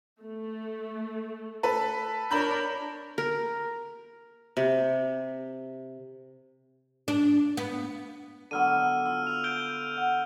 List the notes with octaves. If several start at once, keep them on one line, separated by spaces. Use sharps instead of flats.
A3
A4 B4
D4 A#4 C#5 A5 B5 G6
A#4
C3
D4
B3
D3 F#3 B3 E6 F6 D#7
F4 E6
E6 F7
G6 D7 G7
F#5